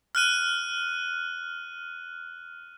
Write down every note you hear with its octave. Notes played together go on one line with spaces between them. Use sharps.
F6 F#6 D#7